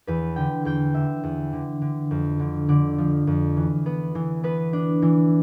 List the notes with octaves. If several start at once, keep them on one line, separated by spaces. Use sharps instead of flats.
E2 B4
D3 G5
E2 G5
D3 E5
E2
D3
D3
F2
D3
D3 D5
F3
F2
E3
B3
E3
B3 B4
D4
E3